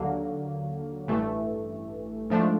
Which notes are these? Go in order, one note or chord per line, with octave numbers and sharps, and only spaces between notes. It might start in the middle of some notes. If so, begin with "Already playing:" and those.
Already playing: D#2 D3 F#3 A#3
A1 G2 E3 A3
G#2 F3 A3 D4